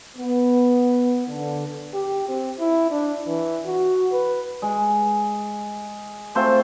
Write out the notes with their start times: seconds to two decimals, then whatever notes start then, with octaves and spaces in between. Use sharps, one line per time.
0.16 B3
1.28 D3
1.94 G4
2.28 C4
2.60 E4
2.91 D4
3.27 E3
3.66 F#4
4.12 B4
4.62 G#3
6.35 A3 C4 F4 C5